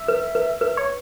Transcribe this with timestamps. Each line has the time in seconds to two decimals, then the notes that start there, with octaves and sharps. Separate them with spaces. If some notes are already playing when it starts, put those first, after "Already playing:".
Already playing: E5
0.08 B4
0.35 B4
0.61 B4
0.77 C#5